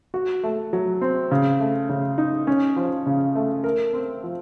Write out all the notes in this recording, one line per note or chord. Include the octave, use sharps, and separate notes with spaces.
F#4
A3
F#3
C4
C#3
A3
C#3
D#4
C#4
F3
C#3
A3
A#4
C4
F3